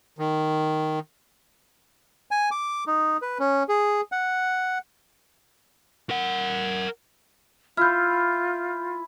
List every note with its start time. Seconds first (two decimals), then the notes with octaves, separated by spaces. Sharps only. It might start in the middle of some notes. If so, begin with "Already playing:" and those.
0.19 D#3
2.31 G#5
2.51 D6
2.87 D#4
3.22 B4
3.39 C#4
3.69 G#4
4.12 F#5
6.10 A#4 F#5
7.77 E4 F4 F6 G6